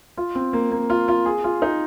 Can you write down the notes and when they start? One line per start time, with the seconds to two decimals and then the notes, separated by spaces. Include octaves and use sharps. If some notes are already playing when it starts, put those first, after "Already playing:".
0.17 F4
0.35 C4
0.53 A#3
0.71 A#3
0.90 F4
1.08 F4
1.26 G#4
1.44 F4
1.62 D#4